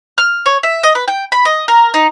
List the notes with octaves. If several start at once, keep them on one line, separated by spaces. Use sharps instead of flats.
F6
C#5
E5
D#5
B4
G5
B5
D#5
A#4
D#4